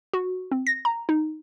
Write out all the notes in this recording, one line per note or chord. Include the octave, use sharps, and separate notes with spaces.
F#4
C4
A#6
A#5
D#4